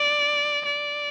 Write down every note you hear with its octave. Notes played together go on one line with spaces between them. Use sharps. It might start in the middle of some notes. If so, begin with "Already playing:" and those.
Already playing: D5
D5